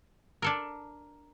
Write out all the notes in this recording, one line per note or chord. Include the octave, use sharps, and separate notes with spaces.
D4 A4 A#4